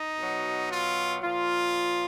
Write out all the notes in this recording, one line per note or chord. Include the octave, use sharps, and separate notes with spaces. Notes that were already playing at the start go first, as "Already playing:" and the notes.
Already playing: D#4
B2 F#3
F4
A#2 F3 F4